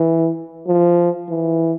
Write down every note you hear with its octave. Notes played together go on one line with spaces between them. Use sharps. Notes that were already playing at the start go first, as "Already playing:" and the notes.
Already playing: E3
F3
E3